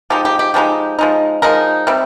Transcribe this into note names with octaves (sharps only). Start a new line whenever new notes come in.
F3 G#3 D#4 G4
G4
G4
F3 G#3 D#4 G4
F3 G#3 D#4
F3 G#3 D#4 A#4
C3 G3 C4